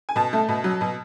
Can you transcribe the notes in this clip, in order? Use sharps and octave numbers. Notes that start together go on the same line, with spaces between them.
G#5
B2 A5
A3
B2
F#3
B2